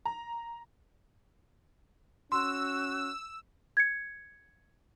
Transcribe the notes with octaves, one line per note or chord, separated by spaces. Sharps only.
A#5
C#4 F#4 C6 E6
G#6 C#7